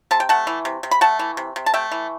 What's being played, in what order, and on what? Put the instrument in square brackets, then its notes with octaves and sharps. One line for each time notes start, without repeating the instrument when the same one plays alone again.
[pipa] C3 A5
G5
A3 F#5 A5
E3
C3
C3
B5
A3 F#5 A5
E3
C3
C3
A5
A3 E5 G5
E3